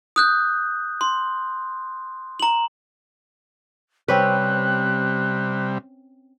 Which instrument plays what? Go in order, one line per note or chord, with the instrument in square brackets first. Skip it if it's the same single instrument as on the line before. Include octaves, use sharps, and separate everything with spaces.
[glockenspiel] D#6 F#6 G6
C6
A#5 F#7
[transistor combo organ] C3 G3 [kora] C4 C#4 B4 [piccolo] F#6